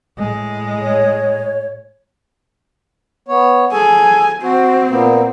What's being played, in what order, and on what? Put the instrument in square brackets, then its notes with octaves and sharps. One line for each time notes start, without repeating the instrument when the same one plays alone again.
[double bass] A2 G#3
[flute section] C#5
[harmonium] B3 C#5
[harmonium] G#4 A4 [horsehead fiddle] G#5
[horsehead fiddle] C4 [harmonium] F#4
[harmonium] A#2 A#3 B3